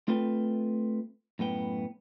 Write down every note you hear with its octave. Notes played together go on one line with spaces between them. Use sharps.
A3 C4 F4 A4 B4 G5
F#2 A2 B3 G5